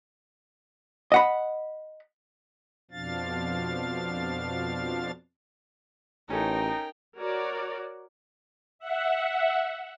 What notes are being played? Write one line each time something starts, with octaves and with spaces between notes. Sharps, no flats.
D#5 F#5 B5
F2 B2 F3 D4 F5 A6
A1 C#4 D#4 A4 A#4 G5
F#4 A#4 C#5 D5
E5 F#5